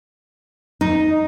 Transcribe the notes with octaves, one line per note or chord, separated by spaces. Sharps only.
D#4